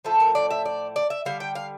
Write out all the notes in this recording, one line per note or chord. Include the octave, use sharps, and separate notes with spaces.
A2 F3 A3 A4
A#4
D5
E5
D5
D5
E5
D3 G3 F5
G5
F5